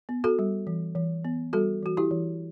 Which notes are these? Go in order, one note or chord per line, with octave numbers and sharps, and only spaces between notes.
B3
F#4 A4
G3
E3
E3
B3
G3 F#4 A4
E3 F#4
E4 G4
E3